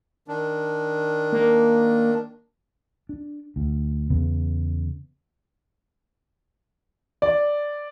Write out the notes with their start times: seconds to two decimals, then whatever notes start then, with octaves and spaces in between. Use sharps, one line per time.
0.28 D#3 D4
1.33 A#3
3.09 D4
3.56 D2
4.10 E2 C#3 B3
7.22 D5